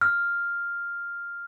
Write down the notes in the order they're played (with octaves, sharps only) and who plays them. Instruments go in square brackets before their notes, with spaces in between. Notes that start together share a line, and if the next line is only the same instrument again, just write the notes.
[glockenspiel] F6